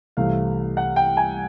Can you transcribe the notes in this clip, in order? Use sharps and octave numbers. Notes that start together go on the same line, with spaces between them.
C2 C3 E3 A3 F5
F#5
G5
G#5